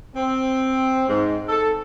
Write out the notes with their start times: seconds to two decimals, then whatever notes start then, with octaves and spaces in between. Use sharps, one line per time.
0.16 C4
1.09 G#2
1.49 A4